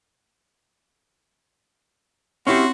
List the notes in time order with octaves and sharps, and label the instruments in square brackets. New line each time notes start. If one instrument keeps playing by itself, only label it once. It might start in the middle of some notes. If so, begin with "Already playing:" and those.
[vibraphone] C4 [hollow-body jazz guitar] C#4 E4 G4 [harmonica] F#4 C6 [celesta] C#5 C#6